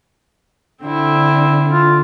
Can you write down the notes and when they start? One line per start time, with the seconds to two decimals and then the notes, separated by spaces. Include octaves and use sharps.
0.84 D3 C4 E4
1.70 F4